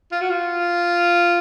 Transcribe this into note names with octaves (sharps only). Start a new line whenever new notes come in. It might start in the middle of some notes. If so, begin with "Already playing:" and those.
F4
F#4
F4